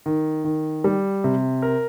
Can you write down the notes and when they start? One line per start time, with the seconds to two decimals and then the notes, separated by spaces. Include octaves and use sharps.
0.06 D#3
0.44 D#3
0.84 G3
1.24 C3
1.62 A#4